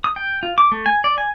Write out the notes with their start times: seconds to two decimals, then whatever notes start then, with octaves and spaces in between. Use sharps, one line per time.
0.04 D#6
0.16 G5
0.43 F4
0.58 D6
0.72 A3
0.86 G#5
1.04 D5
1.18 G#5